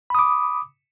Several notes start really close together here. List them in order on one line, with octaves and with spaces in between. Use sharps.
B5 D#6 D6